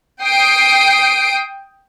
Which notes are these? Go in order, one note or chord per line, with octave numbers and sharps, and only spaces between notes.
G5 D#6 C7 D7